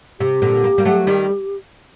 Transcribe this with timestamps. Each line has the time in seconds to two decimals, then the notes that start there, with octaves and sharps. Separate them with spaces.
0.20 C3 G4
0.42 A#2 D3
0.64 A#3
0.78 G3 A#3
0.85 F#3 A3
1.07 D#3 G3